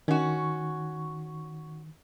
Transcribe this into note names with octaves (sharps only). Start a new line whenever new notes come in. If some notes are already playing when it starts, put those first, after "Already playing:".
D#3 C#4 F#4